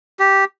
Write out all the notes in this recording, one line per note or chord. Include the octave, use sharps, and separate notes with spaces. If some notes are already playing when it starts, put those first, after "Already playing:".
G4